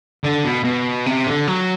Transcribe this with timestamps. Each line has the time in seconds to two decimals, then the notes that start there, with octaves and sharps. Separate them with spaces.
0.24 D3
0.44 B2
0.64 B2
1.06 C3
1.26 D3
1.47 F#3